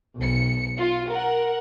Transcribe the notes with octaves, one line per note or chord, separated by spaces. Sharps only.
B1 C#7
F4
A#4 F#5